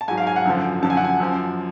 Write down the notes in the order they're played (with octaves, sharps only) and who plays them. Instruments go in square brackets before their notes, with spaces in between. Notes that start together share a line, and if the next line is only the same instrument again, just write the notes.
[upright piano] A5
G#2 G#5
F#3
F5
G#5
F#5
F#2 D3 F3
F#2 D3 F3 A5
G#5
F#5
G#5
F#2 F3